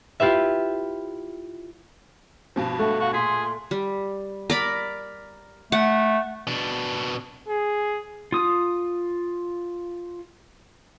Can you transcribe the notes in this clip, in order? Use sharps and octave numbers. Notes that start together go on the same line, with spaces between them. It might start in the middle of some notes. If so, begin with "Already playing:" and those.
E4 F4 G4 B4 E5
G2 B2 F3
A3 F#4
F#4 F5
A#2 G#4 C6 B6
G3
A#4 D5 B5
A3 F#5
B2 D4
G#4
F4 D#6